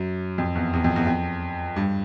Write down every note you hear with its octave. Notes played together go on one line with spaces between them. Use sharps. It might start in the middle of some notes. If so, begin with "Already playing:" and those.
Already playing: F#2
F2
E2
E2
F2
E2
F2
G2